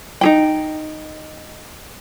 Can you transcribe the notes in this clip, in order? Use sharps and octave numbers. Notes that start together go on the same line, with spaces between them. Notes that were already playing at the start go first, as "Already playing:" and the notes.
D#4 G#4 G5